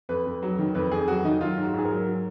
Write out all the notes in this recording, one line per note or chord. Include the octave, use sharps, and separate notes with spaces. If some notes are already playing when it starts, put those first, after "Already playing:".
F2 B4
F2
F#3
D#3
F2 B4
F2 G#4
F#3 F#4
D#3 D#4
F#3 F4
G#2
F#4
G#2 G#4
A#4
F#3
F#3